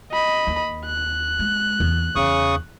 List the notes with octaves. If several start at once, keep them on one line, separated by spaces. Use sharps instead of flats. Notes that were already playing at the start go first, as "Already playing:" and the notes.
D#5 B5
D#2
F#6
G#3
E2
E2 C#3 C#6 D#6